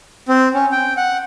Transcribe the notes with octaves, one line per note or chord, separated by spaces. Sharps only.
C4
C#4
G5
F#5